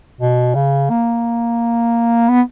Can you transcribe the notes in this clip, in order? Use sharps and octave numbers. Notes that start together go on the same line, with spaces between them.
B2
C#3
A#3
B3